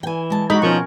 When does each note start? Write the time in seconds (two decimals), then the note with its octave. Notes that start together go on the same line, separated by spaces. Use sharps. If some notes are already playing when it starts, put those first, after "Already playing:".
0.03 E3 G5 G#5
0.30 G#3 A5
0.50 G#3 D4 D#4 F#4 A#4 B5
0.62 B2 F3 C#4 A#4 C#6